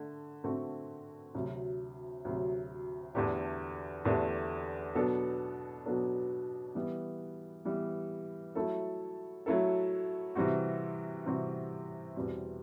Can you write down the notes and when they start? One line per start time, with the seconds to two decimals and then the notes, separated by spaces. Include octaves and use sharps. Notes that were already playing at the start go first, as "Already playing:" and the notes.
Already playing: D3 A3
0.44 D3 A3 C4 F#4
1.34 D2 C3 F#3
2.25 D2 C3 F#3
3.15 E2 D3 A3 D4 G4
4.05 E2 D3 A3 D4 G4
4.95 B2 F#3 B3 D4 A4
5.86 B2 F#3 B3 D4 A4
6.75 E3 G3 B3
7.65 E3 G3 B3
8.55 F#3 A3 E4 A4
9.46 F#3 A3 E4 A4
10.35 C3 E3 G3 C4 F#4
11.26 C3 E3 G3 C4 F#4
12.16 E2 B2 G3 C4